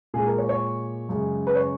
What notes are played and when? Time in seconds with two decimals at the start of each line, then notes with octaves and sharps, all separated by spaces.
0.14 A#2 G#3 G#4
0.26 A#4
0.38 C#5
0.49 C#5
1.09 F#2 C#3 G#3
1.47 B4
1.55 C#5